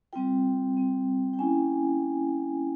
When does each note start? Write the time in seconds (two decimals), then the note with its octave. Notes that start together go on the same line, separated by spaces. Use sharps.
0.13 G3 C4 F4 G5
0.76 G3 C4 F4
1.33 G5
1.38 A#3 C#4 E4 G#5